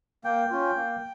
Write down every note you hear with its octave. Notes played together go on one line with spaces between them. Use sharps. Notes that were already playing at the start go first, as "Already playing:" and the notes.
A#3 G5
C#4 F4
A#3